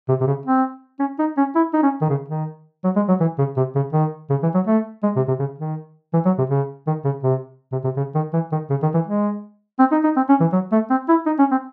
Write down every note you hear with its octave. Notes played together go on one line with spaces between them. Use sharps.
C3
C3
C#3
C4
C#4
D#4
C#4
E4
D#4
C#4
D#3
C#3
D#3
F#3
G#3
F#3
E3
C#3
C3
C#3
D#3
C#3
E3
F#3
A3
G#3
C3
C3
C#3
D#3
E3
F#3
C3
C#3
D#3
C#3
C3
C3
C3
C#3
D#3
E3
D#3
C#3
D#3
E3
G#3
C4
D#4
D#4
C4
C#4
E3
F#3
A3
C4
E4
D#4
C#4
C4